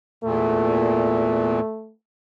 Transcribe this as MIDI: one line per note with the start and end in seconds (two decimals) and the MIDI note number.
0.24 1.60 40
0.24 1.60 46
0.24 1.92 57